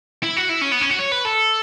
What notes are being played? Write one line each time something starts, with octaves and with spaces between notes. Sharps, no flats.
E4
F#4
E4
C#4
B3
C#4
F#4
C#5
B4
A4